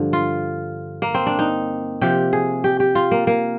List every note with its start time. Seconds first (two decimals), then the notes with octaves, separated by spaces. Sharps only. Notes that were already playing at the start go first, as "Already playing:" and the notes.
Already playing: G2 D3 F3
0.13 F4
1.02 A#3
1.15 C4
1.27 D4
1.39 D#4
2.01 C3 F3 G4
2.33 G#4
2.64 G4
2.80 G4
2.95 F4
3.11 A#3
3.27 A#3